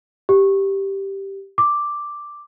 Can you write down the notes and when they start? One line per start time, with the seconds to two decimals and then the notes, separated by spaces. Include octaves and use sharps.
0.29 G4
1.58 D6